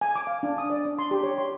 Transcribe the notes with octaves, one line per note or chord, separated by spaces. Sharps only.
G#5
D6
F5
D4
D#6
D5
D4
C6
G4
C#5
C6